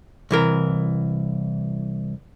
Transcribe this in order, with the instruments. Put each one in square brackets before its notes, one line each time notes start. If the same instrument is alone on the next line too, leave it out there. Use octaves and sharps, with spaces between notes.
[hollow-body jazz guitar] C2 E3 A#4